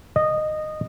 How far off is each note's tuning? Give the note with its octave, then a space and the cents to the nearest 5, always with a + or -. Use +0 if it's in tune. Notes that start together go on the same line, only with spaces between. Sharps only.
D#5 -15